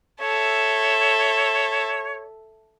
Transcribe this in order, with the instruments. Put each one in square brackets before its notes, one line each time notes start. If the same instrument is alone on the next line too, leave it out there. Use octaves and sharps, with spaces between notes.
[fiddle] A4 E5 [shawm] C#5